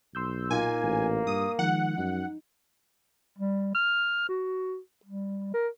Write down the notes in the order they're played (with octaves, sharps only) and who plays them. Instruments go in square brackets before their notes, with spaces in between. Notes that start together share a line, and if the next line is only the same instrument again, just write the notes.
[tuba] B1 [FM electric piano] C6 E6 G6
[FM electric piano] A#2 D#4 F4 [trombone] A#3 [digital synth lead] G#5
[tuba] A1
[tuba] G2 [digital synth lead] D#6
[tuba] D#3 [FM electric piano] F3 G#3 [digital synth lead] F#5
[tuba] F#2 [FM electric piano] D#4
[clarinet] G3
F6
F#4
G3
A#4